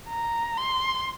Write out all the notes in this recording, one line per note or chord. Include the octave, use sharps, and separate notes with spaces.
A#5
C6